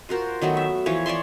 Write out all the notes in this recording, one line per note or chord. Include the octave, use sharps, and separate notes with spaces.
F4 F#4 A#4 C5
D#3 F#3 A3 B3
E5
E3 F3 C#5
C#5 D5 E5 C6